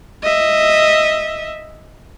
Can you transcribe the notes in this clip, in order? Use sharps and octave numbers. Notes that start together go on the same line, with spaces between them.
D#5 E5